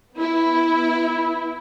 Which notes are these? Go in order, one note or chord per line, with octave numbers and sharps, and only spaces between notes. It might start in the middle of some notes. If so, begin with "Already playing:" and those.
B3 E4